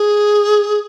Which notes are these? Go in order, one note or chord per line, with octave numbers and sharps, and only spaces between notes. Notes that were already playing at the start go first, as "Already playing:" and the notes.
Already playing: G#4